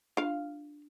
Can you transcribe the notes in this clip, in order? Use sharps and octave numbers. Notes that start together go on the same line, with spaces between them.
D4 F4 F5